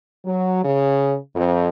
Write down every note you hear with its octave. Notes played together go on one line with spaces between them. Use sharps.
F#3
C#3
F2